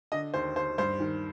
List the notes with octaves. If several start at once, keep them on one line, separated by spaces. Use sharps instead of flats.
D3 D#5
D#2 C5
D#2 C5
G2 C5
D#3